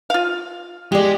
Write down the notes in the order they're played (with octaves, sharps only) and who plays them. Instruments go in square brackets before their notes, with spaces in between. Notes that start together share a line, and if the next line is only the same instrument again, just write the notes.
[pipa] F4 F5
[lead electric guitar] G#3 G#4 [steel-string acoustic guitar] G4 D5